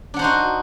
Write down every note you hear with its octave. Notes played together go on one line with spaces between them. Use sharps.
D4 D#4 F#4 C5 F#5